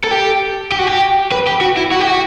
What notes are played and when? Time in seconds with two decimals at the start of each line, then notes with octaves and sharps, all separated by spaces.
0.04 A4
0.11 G4
0.72 G4
0.79 F#4
0.87 G4
1.32 B4
1.47 G4
1.61 F#4
1.77 E4
1.91 F#4
2.00 G4
2.07 F#4